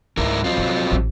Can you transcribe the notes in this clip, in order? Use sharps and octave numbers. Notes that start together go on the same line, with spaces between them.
C#2 G#2 E4 A#4
F#3 C4 F4
C2
A1